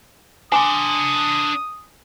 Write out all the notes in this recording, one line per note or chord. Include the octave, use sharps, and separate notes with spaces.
D4 G#5 C6 D6 D#6